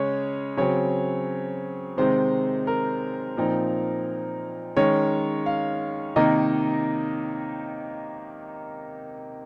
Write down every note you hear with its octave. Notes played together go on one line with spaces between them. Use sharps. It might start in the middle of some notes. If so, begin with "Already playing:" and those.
Already playing: C#3 G#3 C#4 C#5
C#3 F#3 C4 C#5
C3 D#3 G#3 C4 D#4 C5
A#4
A#2 F3 C4 D#4
D#3 G#3 C#4 C#5
F5
C3 D#3 A#3 D#4 D#5